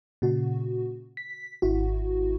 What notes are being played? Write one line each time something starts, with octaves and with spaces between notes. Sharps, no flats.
A#2 C#3 F#4
B6
G#1 E4 F#4